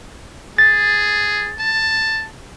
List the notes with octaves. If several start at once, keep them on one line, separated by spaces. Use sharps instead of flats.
G#4 A6
A5